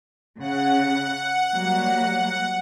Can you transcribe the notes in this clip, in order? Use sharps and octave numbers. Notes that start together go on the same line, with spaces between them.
C#3 F#5
F#3 G3 A#3